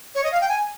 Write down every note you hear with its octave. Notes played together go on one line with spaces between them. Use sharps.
C#5
D#5
F5
G5
G#5